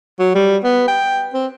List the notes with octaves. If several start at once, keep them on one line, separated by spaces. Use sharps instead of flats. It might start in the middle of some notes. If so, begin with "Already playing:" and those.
F#3
G3
B3
G5
C4